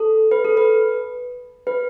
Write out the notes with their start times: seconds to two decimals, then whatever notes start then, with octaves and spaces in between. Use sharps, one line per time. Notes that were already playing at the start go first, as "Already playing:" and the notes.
Already playing: A4
0.31 B4
0.45 A4
0.57 B4
1.67 B4